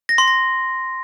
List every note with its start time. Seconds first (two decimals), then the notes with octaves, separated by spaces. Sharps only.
0.09 A#6
0.18 C6
0.27 A#6